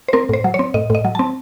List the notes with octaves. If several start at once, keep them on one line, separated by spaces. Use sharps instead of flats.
C5
C4 A#4
A2 C5
F#3
C#5
C4
A2 D#5
A2 D#5
F#3
C4 A5